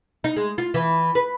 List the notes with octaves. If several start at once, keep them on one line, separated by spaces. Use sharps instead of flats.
D#4
G#3
F4
E3
B4